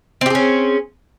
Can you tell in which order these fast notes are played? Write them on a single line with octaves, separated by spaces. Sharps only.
C4 G4 G#4 C#4